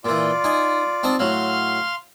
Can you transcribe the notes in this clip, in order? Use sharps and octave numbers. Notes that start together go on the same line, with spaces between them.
A#2 E3 F4 D5
D#4 G#5
C4 D#4 A5
A2 F#3 F5 C6 F6